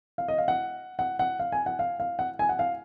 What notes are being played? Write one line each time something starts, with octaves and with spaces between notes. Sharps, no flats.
F5
D#5
F5
F#5
F#5
F#5
F5
G#5
F#5
F5
F5
F#5
G#5
F#5
F5